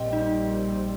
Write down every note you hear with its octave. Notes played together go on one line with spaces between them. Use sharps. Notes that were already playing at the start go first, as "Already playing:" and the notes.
Already playing: A#1 A#2 G3 C4 D#5 G5
D#4